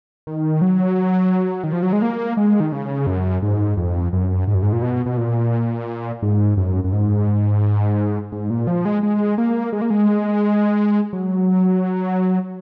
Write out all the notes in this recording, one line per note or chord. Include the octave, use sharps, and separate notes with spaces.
D#3
F#3
D#3
F3
F#3
G#3
A#3
G#3
D#3
C#3
F#2
G#2
F2
F#2
G#2
F#2
G#2
A#2
B2
B2
A#2
G#2
F#2
F#2
G#2
G#2
A#2
F3
G#3
G#3
A#3
G#3
A#3
G#3
F#3